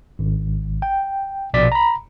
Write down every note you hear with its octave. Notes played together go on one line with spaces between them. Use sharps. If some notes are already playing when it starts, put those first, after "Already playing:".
G#1
G5
A#1 B2 D5 B6
A#5 B5